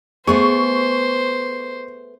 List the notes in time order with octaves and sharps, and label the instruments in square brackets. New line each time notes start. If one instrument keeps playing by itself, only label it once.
[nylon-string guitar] A3 B3 G#4 [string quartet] C5 [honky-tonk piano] C#6